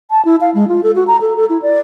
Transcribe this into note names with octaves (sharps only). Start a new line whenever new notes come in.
A5
E4
F5
G#3
F4
A4
F#4
A#5
A4
A4
E4
D5